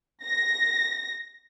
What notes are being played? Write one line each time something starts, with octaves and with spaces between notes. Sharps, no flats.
A#6